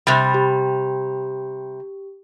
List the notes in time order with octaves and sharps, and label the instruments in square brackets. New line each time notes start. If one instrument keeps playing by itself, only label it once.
[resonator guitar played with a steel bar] C3 G3 [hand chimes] B5 A6
[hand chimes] G4